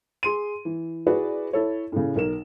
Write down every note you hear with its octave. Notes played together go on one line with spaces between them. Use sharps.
G#4 C6 D#7
E3
E4 F#4 G#4 B4 D5
E4 A4 C#5
A2 C#3
B1 A#4 E7